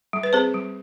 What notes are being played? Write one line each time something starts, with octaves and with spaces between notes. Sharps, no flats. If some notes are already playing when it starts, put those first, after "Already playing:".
G3
B4
C4 G#4 C5
G3